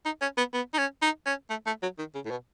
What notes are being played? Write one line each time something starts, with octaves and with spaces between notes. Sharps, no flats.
D#4
C#4
B3
B3
D#4
C#4
D#4
C#4
A3
A3
F#3
D#3
C#3
A2
B2